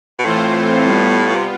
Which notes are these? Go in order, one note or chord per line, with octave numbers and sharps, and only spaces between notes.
B2
A2 E3 A3 C4 F4 C5
G3 B3 F4
C3